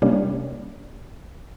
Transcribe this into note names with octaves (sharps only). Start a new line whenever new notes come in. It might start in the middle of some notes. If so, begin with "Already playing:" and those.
C3 G3 A#3 C#4 D4